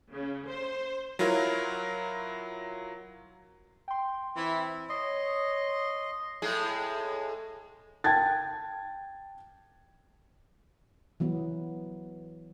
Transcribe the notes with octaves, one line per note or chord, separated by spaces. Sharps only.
C#3
C5
F#3 E4 F4 A#4
G5 C6
E3 C4 E4
C#5 D#5 C6
A2 G#3 G#4
G5 A5 G#6 A6
E3 F#3 B3